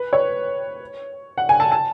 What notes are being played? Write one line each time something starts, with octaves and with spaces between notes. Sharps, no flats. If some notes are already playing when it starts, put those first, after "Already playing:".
Already playing: B4
C#5
F#5
G#5
A5
A5